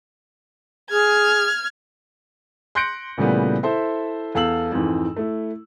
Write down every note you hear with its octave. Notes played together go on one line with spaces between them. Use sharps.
G#4 F6 G#6
C6 F#6 G6 A#6 C#7 D7
A#2 C#3 E3 G3 A3 B3
E4 A4 C5 E5
E2 A4 F5 E6 F#7
F2 G#2 E3
A3 E4